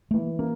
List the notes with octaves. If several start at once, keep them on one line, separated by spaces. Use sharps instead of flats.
A3
E3 A#3
A#3 C#4